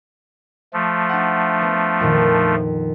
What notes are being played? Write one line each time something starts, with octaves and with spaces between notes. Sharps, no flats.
F3 A3
D4 F#5
B3
F2 A#2 D#3